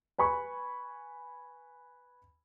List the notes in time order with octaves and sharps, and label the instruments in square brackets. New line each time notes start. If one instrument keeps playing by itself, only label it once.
[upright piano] B4 G#5 B5 C#6